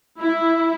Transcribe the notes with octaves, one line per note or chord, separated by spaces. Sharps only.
E4